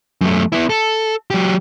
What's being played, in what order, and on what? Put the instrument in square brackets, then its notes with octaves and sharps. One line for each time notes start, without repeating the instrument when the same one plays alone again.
[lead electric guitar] F#2 A3
B3 E4
A4
F#3 G4